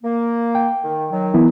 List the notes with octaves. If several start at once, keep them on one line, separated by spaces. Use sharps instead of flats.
A#3
G5
D#3
D#3 F#3
E3 B3 E4